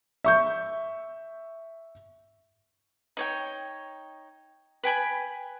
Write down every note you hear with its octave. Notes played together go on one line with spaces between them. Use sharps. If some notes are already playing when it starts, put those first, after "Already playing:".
E5 C#6 G6
D#4 C#5 G5
B4 G5 G#5 B5